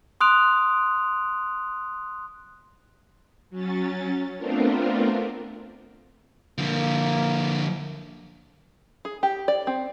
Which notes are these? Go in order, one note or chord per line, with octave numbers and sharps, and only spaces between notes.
C6 D#6 F#6 D7 F7
F#3 C#4 A6
A3 B3 C4 D4 F4 A#4
D3 F3 A#3
G#4
G4
D5
C4